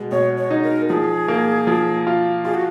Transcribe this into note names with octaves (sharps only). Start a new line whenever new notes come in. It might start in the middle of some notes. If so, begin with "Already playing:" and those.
Already playing: B2 G#3
B2 C#5
C#5
D#4
A#4
F3 G#4
A#3
F3
F4
F4 G#4
F#4